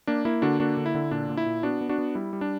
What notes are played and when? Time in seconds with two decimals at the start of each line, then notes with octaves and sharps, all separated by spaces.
0.07 A#3 D4
0.25 A#3 E4
0.42 D3 D4 F#4
0.60 A#3 D4 F#4
0.77 D3
0.86 E4
0.95 D3
1.11 A#2 D4
1.29 A#2
1.37 E4
1.46 A#2
1.63 B3 D4 F#4
1.81 B3
1.89 D4 F#4
1.98 B3
2.15 G3 E4
2.33 G3
2.41 D4